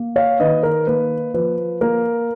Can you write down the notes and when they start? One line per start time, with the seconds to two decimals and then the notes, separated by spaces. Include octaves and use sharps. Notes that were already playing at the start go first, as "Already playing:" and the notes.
Already playing: A#3
0.16 C#5 F5
0.40 D#3 B4 D#5
0.63 A#4
0.87 A#3 B4
1.34 F3 B4
1.81 A#3 A#4